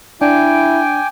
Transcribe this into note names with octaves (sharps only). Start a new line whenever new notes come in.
D4 E4 G5 G#5 D6